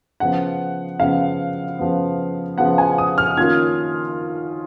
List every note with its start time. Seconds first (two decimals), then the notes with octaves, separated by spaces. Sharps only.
0.20 C#3 F3 B3 F#5
1.00 C#3 F3 B3 F5
1.79 C#3 F3 B3
2.58 C#3 F3 B3 F#5
2.78 G#5
2.98 D#6
3.18 F6
3.37 D#3 A#3 C#4 F4 G#6